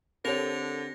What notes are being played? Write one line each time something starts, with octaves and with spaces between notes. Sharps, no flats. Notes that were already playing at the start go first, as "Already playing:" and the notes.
D3 C4 G4 A4 A#4 C#5 A#6 F7